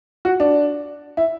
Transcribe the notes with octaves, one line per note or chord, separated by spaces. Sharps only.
F#4
D4
E4